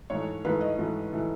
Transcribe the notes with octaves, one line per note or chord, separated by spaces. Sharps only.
G#2 E3 A3 C#5
G#2 E3 A3 B4
D#5
G#2 E3 A3
E3 A3